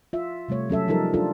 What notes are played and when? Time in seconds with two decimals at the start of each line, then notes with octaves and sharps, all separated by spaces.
0.13 F4 E5
0.49 C3 G3 A3 C#5
0.70 F#3 C#4 A4 E5
0.88 F3 G3 D#4 A4 A#4
1.14 D4 F4 A4